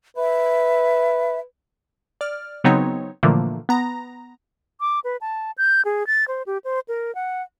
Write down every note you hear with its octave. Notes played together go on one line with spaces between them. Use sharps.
B4 E5
D5 F6
C#3 F#3 B3 C4 D#4 C#5
A#2 D3 E3 F3 A3 A#3
B3 A#5 A#6
D6
B4
A5
G6
G#4
A6
C5
G4
C5
A#4
F#5